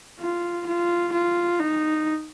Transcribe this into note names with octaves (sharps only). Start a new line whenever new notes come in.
F4
F4
F4
D#4